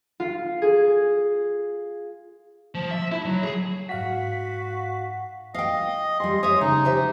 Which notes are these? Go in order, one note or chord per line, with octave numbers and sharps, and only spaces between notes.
F4
G#4
F3
E5
E4
F#3
G#4
G#2 F#4 F5 B6
D#5 F5 G5
G3 G#4 C6
C#5 E5 D#6
C#3 D#4
G4 C5 E5